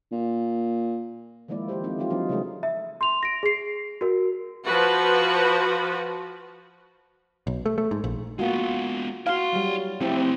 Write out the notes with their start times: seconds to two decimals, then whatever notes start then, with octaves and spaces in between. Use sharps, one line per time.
0.12 A#2
1.48 D#3 F3 G#3 A#3 E4 D5
1.68 F3 A#3 G4 C5
1.84 A3 C4 D#4
1.99 E3 F#3 D#4 F4 G4
2.10 F3 F#3 C4 D4 D#4
2.29 C#3 F#3 G#3 A3 G#4
2.63 E5
3.01 C6 F7
3.23 A#6 D7
3.43 G#4 C7
4.01 F#4 A#4
4.65 F3 F#4 B4
7.47 B1
7.66 A3
7.78 A3
7.91 G#2
8.04 A#1
8.39 G#3 A#3 B3 F4 F#4
9.27 E4 F#4 F5 C6
9.53 F#3 G3
10.01 F3 A3 C4 E4 G4